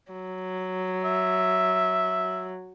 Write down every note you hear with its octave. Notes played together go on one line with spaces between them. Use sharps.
F#3
E5